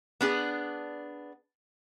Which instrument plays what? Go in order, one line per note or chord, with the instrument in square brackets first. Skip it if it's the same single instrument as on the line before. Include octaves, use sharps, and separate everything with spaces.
[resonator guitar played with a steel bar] B3 D4 G#4